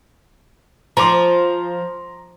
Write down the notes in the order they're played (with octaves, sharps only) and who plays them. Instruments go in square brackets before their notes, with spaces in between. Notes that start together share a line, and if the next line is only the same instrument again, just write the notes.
[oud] F3 [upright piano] A#5 C6 D6